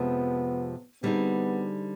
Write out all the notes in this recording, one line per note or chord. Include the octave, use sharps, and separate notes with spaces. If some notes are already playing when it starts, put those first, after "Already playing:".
Already playing: F2 C3 F3 G#3 B3
D3 G3 B3 C4 D#4 G#4